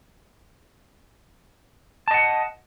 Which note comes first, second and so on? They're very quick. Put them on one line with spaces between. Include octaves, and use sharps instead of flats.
A5 D#5 F#5